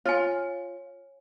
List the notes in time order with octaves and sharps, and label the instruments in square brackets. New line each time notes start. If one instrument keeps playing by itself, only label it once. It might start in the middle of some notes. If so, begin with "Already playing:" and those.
[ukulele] F4 [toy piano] C#5 G#5